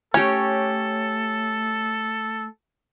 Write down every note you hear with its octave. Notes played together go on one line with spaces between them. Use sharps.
A3 C#4 G4 A4 C#5